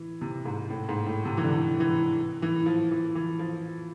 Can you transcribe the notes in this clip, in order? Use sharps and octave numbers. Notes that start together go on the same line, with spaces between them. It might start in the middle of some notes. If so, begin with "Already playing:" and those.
Already playing: E3
C3
G#2
A2
G#2
A2
C3
E3
D3
E3
E3
F3
E3
E3
F3